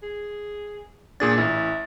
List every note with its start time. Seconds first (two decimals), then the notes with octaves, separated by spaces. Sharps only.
0.03 G#4
1.20 A#2 D4 G#4 A6
1.38 A1 E4